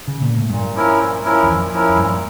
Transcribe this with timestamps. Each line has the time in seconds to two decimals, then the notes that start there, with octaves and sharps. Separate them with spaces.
0.08 C#3
0.22 A#2
0.36 A2
0.50 G2 A#2
0.75 F3 C#4 E4 A#4
0.99 A#2
1.23 F3 C#4 E4 A#4
1.43 E2
1.49 F2 A#2
1.73 F3 C#4 E4 A#4
1.89 F2
1.98 G2 A#2